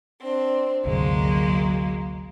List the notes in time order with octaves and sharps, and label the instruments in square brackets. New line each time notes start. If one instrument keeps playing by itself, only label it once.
[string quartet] C4 D4
[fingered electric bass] G1 D2 C3 [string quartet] F#3 G#3 A#3